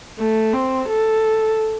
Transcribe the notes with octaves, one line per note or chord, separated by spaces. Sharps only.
A3
C4
A4